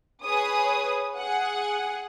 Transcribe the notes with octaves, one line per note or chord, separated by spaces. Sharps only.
G#4 B4 C#5 D#6
G#4 F#5